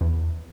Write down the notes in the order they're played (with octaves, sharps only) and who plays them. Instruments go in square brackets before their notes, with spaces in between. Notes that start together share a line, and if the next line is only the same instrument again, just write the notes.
[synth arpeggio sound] E2